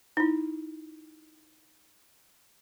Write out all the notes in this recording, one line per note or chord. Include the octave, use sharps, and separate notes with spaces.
D#4 E4